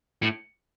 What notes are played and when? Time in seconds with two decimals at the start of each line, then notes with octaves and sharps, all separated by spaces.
0.22 A2